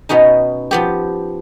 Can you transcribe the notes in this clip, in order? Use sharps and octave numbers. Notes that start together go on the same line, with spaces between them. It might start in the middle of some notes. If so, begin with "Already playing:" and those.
B2 B3 C#4 D#4
F3 B3 G4